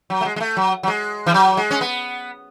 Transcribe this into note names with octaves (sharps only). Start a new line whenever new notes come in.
F#3
A3
G#3
G#3
A3
F#3
F#3
G#3
E3
F#3
G#3
C#4
B3